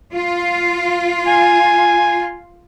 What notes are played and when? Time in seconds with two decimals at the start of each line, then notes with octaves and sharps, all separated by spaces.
0.14 F4
1.27 G#5